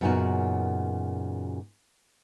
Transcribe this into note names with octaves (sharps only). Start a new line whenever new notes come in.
F#2 A#2 C#3 B3 D#4 F#4